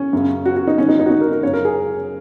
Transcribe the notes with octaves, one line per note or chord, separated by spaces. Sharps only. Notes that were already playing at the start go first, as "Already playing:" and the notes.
Already playing: C#4
F#2 C#3
F#4
F#4
D#4
G#2 D#3 C#4
D#4
D#4
F#4
D#4
A#4
A#4
F#2 C#3 C#5
A#4
G#4